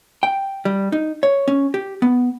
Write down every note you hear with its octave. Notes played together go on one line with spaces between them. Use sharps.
G5
G3
D#4
C#5
C#4
G4
B3